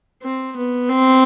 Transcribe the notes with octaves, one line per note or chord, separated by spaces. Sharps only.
C4
B3
C4